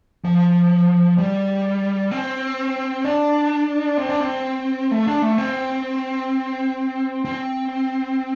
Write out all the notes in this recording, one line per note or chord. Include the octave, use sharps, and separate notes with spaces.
F3
G3
C4
D4
C4
D4
C4
A3
D4
A3
C4
C4